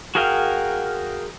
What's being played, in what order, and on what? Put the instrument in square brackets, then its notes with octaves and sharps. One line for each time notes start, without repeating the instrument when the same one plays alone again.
[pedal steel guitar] F#4 G#4 A#4 F5 G5